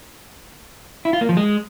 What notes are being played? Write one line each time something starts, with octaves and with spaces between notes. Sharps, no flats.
E4
F4
A#3
F3
G#3